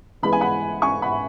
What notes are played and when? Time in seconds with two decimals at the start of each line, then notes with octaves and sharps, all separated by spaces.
0.23 E3 G#3 B3 B5
0.32 G#5
0.41 F#5 B5
0.82 G#5 C#6
1.02 F#5 B5